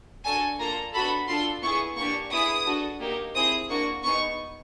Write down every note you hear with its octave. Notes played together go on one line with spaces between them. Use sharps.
D4 F#4 A4 G#5
A#3 D4 F4 A4 A#5
B3 D4 F#4 A4 B5
D4 F4 A4 C6
B3 E4 G#4 C#6
A#3 D4 G4 C#6
B3 E4 G#4 D#6
D4 F#4 A4
A#3 D#4 G4
C4 E4 G#4 D#6
A#3 D4 F#4 C#6
B3 D#4 G#4 C#6